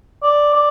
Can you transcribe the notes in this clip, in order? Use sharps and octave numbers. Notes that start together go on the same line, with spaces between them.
D5
D5